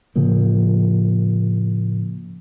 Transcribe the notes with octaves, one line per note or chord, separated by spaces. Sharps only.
A2 C#3 F3 A#3